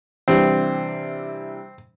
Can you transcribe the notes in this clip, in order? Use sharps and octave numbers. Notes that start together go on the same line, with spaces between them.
C3 E3 G3 C4 D4